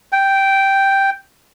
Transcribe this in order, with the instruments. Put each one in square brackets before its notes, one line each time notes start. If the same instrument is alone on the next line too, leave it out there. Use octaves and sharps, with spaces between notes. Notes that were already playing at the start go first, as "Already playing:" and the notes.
[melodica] G5